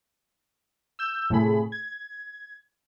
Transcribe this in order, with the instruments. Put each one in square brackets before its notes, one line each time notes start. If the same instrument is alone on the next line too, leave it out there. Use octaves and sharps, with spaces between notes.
[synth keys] E6 G6
A2 C3 A3 G#4 B5
G#6